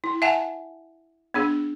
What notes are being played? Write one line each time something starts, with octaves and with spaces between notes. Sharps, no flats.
E4
E5 F#5 G#5 A5
B3 D4 G#4